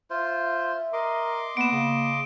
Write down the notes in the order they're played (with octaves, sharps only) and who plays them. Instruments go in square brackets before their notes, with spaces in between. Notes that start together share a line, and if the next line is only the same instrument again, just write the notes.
[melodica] F4 C5 [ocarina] E5
[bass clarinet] A#4 [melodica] D#5 C6 D6
[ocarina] A#3 [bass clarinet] B3 [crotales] D7 E7
[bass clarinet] C#3